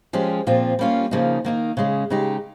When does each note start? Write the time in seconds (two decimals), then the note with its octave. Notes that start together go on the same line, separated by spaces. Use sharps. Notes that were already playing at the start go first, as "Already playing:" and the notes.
0.13 F3 G#3 C#4 G4
0.47 A#2 F3 C4 F4
0.79 G3 A#3 C#4 F4
1.11 C#3 F3 A#3 D#4
1.45 D#3 A#3 D#4
1.77 C#3 G#3 C#4
2.10 C#3 G#3 D#4 G4